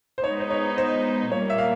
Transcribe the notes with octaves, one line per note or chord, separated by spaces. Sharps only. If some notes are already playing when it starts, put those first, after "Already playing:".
C5
G#3 B3 D#4 C#5
C5
C#5
C5
A#2 G3 A#3 C#5
E5
F5